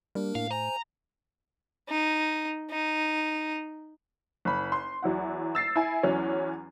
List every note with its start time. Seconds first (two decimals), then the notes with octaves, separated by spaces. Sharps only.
0.15 G3 A#3 D4 A#4
0.35 A2 F5
0.51 C5 G#5 A#5
1.89 D#4
2.71 D#4
4.45 F#1 B5
4.72 C6
5.02 E2 F#3 E4 F#5
5.55 E6 A6 C7
5.76 E4 G#5
6.03 E2 E3 F#3 C#4